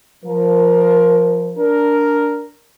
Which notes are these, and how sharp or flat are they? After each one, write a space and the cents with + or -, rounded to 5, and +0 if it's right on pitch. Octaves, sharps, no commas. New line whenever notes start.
F3 +0 A#4 +15
D4 -15 A#4 +0